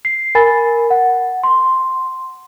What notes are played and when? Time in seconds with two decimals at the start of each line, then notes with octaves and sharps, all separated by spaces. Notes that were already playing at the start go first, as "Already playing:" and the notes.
0.05 C7
0.35 A#4 G#5 B5 A6
0.90 F#5
1.43 C6